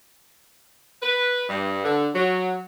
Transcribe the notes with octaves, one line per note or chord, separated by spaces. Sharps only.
B4
G2
D3
F#3